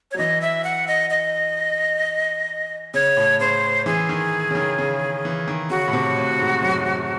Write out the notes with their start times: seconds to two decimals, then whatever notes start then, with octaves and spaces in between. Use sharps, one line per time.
0.11 C#5
0.14 F#3
0.18 E3 D#5
0.41 E5
0.64 F#5
0.88 D#5
1.10 D#5
2.94 C#3 C#5
3.17 A2
3.40 C#3 C5
3.86 E3 G#4
4.09 D#3
4.51 C#3
4.55 D#3
4.79 C#3
5.25 E3
5.48 D#3
5.70 C#3 F#4
5.87 A2
5.93 C3
6.17 A2
6.39 G#2
6.62 F#2